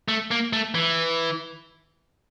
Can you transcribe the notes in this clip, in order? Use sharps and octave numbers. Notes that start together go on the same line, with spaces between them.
A3
A#3
A3
E3